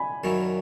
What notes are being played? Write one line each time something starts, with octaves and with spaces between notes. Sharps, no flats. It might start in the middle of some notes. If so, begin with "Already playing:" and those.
Already playing: G#5 B5
F#2 D#3 F#3 C#4 E4